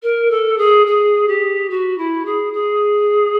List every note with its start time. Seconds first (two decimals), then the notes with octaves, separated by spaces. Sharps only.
0.03 A#4
0.30 A4
0.58 G#4
0.86 G#4
1.28 G4
1.70 F#4
1.98 E4
2.25 G#4
2.53 G#4